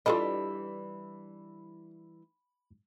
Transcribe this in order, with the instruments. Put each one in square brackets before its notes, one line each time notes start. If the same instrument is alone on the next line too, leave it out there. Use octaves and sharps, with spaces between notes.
[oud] E3 G3 D4 [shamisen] F4 A4 D#5 [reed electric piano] B5